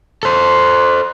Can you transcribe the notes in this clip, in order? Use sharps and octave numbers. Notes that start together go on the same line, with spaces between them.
A4 C5